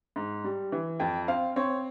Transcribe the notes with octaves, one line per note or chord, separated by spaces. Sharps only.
G#2
G3
E3
F2 G5
C4 F5
C4 C#5